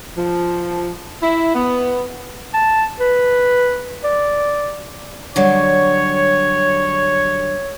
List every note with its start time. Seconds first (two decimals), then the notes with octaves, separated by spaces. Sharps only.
0.17 F3
1.22 E4
1.54 B3
2.54 A5
3.00 B4
4.04 D5
5.36 D3 F#3 G3 C#5